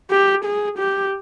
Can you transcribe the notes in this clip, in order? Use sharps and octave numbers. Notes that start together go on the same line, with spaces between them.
G4
G#4
G4